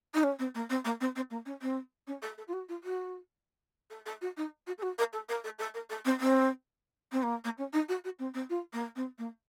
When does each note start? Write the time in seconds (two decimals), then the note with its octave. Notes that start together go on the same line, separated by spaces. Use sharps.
0.14 D#4
0.23 C#4
0.39 C4
0.55 A#3
0.70 C4
0.85 A#3
1.01 C4
1.16 C4
1.30 A#3
1.46 C#4
1.62 C4
2.07 C#4
2.22 A4
2.38 A4
2.48 F4
2.53 F#4
2.69 F4
2.84 F#4
3.90 A4
4.06 A4
4.22 F#4
4.37 D#4
4.67 F#4
4.78 A4
4.82 F#4
4.98 A#4
5.13 A4
5.29 A#4
5.44 A4
5.59 A4
5.74 A#4
5.90 A4
6.05 C4
6.20 C4
7.12 C4
7.23 A#3
7.44 A#3
7.58 C#4
7.73 D#4
7.89 F#4
8.04 F#4
8.19 C4
8.34 C4
8.50 F4
8.73 A#3
8.96 C4
9.18 A#3